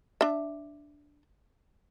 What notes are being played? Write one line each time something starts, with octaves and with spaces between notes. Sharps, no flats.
D4 E5